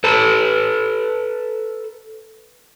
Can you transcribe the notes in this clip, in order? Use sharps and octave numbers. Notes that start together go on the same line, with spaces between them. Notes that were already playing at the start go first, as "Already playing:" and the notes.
A4 B4